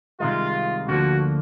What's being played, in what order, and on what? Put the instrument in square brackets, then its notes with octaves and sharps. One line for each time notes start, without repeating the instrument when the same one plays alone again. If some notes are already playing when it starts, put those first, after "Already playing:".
[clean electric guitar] C2 C3 D#3 G#3 [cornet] F4
[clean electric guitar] D2 D3 F3 A#3 [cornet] F#4